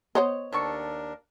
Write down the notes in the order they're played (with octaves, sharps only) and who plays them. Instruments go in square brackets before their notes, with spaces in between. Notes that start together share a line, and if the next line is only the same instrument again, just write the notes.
[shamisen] B3 C5 D#5 [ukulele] C#5
[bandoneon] D#2 D4 A#4 [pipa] C3 A4 C#6